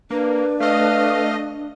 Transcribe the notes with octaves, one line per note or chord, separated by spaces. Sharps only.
A#3 D4 B4
A3 D#5 F5